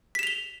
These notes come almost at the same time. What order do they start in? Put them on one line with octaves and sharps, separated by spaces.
B6 E7 F7 G7